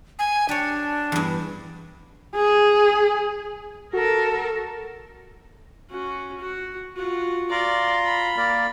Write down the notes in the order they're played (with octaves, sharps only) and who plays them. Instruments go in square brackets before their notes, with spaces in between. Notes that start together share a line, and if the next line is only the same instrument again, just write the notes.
[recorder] G#5
[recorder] D4 [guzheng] G4 C#5
[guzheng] E2 G2
[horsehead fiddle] G#4
[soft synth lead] F#4 [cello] A4 A#4
[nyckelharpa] C#4 F#4
F#4
F4 F#4
[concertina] F4 A#5 C6 [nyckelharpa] D5
[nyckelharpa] B5
[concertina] A#3 A#4 D5